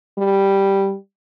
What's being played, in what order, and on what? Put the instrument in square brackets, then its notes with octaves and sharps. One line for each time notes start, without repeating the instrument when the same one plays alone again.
[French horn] G3